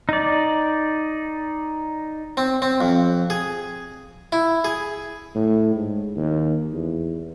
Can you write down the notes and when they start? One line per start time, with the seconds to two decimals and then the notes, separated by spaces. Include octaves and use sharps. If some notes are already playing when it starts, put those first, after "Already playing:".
0.09 D#4 D5
2.37 C4
2.62 C4
2.81 F2
3.30 G#4
4.32 E4
4.64 G#4
5.35 A2
5.75 G#2
6.16 D#2
6.72 E2